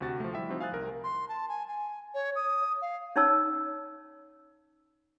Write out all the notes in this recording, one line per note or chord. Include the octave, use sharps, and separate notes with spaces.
D2 C3 F#4 A6
F3 A3
G3 E4 E5 G5
F3 C4 D#4 F#4
F5 G#5 D#6 F#6 A6
C2 A#4
C6
A5
G#5
G#5
C#5
D#6
F5
C#4 D#4 C#5 A5 E6